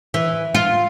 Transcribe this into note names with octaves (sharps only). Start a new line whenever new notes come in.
E3
F4